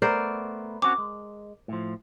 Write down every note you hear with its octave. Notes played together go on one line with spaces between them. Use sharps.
A3 B3 A#4 C5 D5
C4 C#4 F#4 D6
G#3
A2 F3